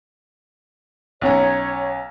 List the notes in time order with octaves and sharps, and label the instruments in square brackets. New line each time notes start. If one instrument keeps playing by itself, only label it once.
[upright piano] B1 C#4 A#5 [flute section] C#5